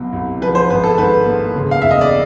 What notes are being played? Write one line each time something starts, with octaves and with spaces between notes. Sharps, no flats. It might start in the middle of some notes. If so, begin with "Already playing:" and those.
Already playing: C2 B2 F#3
C2
F3 B4
C5
G#1 B4
A4
G#2 B4
A#3
C#3
F5
E1 E5
D#5
D5